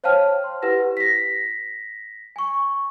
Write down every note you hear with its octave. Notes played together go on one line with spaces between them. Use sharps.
C5 C#5 F5 G5 A5 F6
C6
E4 G4 B4 F#5 A#6
A#6 B6
G#5 C#6